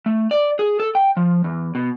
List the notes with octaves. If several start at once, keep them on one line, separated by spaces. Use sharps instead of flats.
A3
D5
G#4
A4
G5
F3
E2
B2